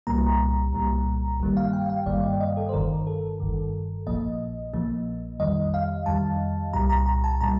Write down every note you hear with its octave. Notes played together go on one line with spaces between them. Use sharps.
C2 A#2 G3 A#3 A#5
C2 A#2 G3 A#3
G1 G2 D#3 G3 A#3
F5
G5
F5
G1 G2 D#3 G3 A#3 D5
D#5
D#5
A4
C5
G1 G2 D#3 A#4
A4
G1 G2 D#3
A#1 A#2 F3 A#3 D#5
A#1 A#2 F3 A#3
F2 D#3 G3 D#5
F5
F2 D#3 G3 A5
C2 A#2 G3 A#5
A#5
A#5
A5
A#2 G3 A#5